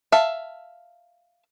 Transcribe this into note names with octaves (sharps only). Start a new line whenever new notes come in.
E5 F5 A5